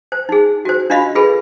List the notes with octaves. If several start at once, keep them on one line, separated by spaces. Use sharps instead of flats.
C5
D#4 G#4
F#4 C5
D4 F4 F#4 D#5 F5 B5
F4 G#4 A4 B4 B5